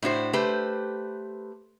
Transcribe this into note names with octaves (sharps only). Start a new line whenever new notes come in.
A2 D4 F#4 C5
A3 G4 B4 C5